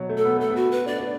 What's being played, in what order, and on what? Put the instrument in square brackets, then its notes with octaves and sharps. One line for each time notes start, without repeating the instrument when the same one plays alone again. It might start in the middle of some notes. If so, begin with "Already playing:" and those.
Already playing: [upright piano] B2 F#3
A3
[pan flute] A4
[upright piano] B3
[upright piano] A3 [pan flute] A4
[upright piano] B3
[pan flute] F#4
B4
[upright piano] D4 [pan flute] D5
[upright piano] D4